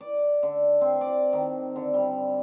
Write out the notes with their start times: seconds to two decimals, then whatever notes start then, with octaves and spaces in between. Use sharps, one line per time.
0.01 D5
0.43 D3
0.81 C4
1.01 D5
1.33 D#3
1.76 D3
1.94 G3